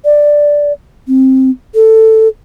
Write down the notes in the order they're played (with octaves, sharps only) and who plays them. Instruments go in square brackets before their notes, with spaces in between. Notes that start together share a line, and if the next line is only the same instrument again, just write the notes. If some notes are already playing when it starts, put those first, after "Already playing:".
[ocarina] D5
C4
A4